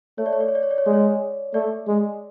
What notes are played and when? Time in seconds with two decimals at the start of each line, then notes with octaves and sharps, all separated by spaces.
0.18 A3 C#5
0.26 D5
0.33 C#5
0.40 D5
0.48 C#5
0.55 D5
0.63 C#5
0.71 D5
0.78 C#5
0.86 G#3 D5
0.93 C#5
1.54 A3 D5
1.88 G#3